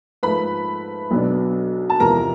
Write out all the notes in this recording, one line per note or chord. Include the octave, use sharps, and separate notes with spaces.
G#2 F3 A3 B4 B5
B1 B2 F#3 B3 D4
A5
E2 C3 F3 A#4 A#5